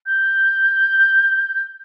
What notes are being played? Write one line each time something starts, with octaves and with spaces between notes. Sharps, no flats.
G6